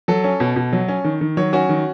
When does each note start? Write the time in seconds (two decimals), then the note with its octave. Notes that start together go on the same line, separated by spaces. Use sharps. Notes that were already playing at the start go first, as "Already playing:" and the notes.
0.08 F#3 A4
0.24 C#4
0.40 B2
0.56 B2
0.73 F#3
0.88 C#4
1.04 D#3
1.21 D#3
1.37 F#3 C#5
1.53 C#4 F#4
1.69 D#3